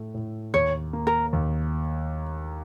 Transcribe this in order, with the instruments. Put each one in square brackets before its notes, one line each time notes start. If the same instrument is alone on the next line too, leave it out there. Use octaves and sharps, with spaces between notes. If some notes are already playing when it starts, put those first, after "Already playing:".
Already playing: [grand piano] A2 A3
A2
[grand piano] D#2 [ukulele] C#5
[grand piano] A#3
[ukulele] A#4
[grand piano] D#2